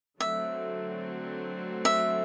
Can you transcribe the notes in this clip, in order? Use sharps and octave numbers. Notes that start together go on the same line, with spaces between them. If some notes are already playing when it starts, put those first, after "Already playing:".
D3 F#3 A3 C4 E5
E5